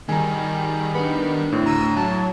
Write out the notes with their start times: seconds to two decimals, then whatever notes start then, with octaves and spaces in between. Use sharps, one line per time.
0.09 D#3 G3 G#4 A#4 G#5 A#5
0.95 B3 D4 B5
1.52 A2 C4
1.66 D2 A#5 E6 D#7
1.97 F#3 A5